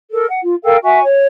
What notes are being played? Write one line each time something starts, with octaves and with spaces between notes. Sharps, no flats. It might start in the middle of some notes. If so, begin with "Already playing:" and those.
A4 A#4
F#5
F4
A4 A#4 F5 G5
F#4 E5 G#5 C#6
C#5